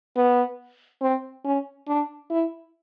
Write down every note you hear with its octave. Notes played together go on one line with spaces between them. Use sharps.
B3
C4
C#4
D4
E4